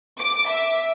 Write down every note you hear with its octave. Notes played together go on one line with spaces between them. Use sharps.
D6
E5